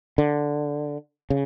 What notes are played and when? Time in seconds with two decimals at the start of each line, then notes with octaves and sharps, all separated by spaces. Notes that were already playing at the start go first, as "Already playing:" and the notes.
0.18 D3
1.30 C#3